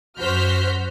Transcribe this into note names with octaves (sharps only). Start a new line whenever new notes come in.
F#2 F#4 C5 F6 G6 B6